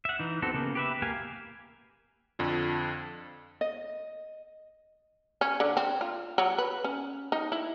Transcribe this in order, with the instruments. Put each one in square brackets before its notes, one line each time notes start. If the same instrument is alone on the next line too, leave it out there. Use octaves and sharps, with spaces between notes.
[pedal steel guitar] E5 F#5
E3 D#4
B3 C4 F#4 A4
C#3 A#3 B3
G4 B4 E5
A#3 G4 F5 G#5
[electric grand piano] F2 D3 F3
[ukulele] D#5
[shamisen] C#4
D3
C4
F4
F#3
B4
C#4
D#4
E4